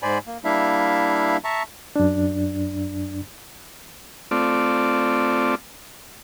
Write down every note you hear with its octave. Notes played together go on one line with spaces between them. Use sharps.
G#2 C5 D5 G#5 B5
A#3
G3 A#3 D4 E4 E5 F5
E5 A5 A#5 C#6
F#2 D4
A3 C4 F4 D5